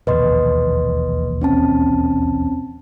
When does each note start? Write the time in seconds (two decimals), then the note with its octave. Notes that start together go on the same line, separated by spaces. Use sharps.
0.07 E1 A#1 D#2 B4 D#5 C6
1.41 C4 C#4 A5